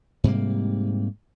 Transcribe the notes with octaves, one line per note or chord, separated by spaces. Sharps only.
G#2 C3 G3 A#3